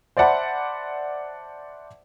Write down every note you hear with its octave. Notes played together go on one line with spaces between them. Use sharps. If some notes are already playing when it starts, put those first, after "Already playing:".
C5 D5 E5 F#5 A5 B5